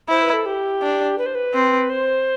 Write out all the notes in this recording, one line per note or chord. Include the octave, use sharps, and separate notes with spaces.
E4 C5
B4
A4
G4
D4
B4
C5
B4
C4
C5